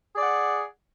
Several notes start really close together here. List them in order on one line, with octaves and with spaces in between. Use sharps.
G#4 D5 F#5